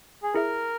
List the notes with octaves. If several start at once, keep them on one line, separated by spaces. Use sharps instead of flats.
G#4
E4 G#4 A#4 E5